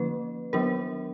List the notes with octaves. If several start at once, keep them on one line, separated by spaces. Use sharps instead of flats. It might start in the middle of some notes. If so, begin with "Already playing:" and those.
Already playing: D3 F3 A#3 C#4 B4
D#3 F#3 B3 D4 A#4